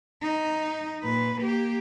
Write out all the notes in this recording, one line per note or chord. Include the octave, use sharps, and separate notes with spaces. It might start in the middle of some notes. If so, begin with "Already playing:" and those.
D#4
A#2 B4
A#3 G4